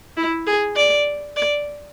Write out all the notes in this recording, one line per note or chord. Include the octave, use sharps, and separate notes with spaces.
E4
G#4
D5
D5